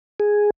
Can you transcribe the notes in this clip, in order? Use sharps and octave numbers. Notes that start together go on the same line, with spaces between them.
G#4